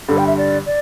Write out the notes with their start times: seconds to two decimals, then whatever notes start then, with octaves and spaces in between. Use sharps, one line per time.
0.08 G2 D3 G3 A4
0.18 G5
0.27 E5
0.38 D5
0.66 D5